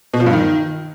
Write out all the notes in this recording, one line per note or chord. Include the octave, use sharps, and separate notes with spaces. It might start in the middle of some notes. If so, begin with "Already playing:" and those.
B2
F3
G2
D#3